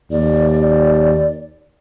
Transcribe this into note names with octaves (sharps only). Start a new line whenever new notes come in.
D#2 D5